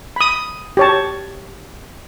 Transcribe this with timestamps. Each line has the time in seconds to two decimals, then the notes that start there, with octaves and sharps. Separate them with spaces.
0.16 B5 D#6
0.77 G4 C#5 A5